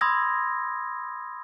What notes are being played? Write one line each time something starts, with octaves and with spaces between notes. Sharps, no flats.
B5 C6 D#6 E6 G#6 A#6